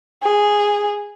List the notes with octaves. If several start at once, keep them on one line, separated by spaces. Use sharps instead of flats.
G#4